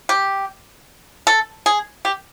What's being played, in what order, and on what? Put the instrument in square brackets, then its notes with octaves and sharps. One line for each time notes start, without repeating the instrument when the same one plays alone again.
[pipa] G4
A4
G#4
G4